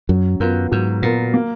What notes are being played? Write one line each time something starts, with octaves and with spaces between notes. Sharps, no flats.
F#2 F#3
F#2 B3 F4 A#4
G#2 F#3
A#2 B3 F4 A#4
A#3